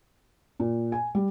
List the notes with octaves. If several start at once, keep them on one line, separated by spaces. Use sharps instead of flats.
A#2
G#5
G3